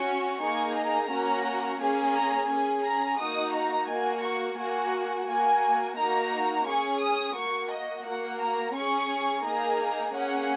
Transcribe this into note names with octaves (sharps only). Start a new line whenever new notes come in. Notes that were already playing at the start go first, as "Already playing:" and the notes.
Already playing: C#4 F#4 C#6
A#3 D#4 G#4 C#6
A#5
A#3 C#4 F#4
A#3 C#4 G#4 G#5
A#5
C#4 G#4 G#5
A#5
A#3 D#4 F#4 D#6
A#5
A#3 F#4 G#5
C#6
A#3 F#4 G#5
A#3 F#4 G#5
A#3 D#4 F#4 A#5
C#4 G#4 C#6
D#6
A#3 F#4 C#6
D#5
A#3 F#4 F#5
A#5
C#4 G#4 C#6
A#3 D#4 G#4 A#5
A#3 C#4 G#4 F#5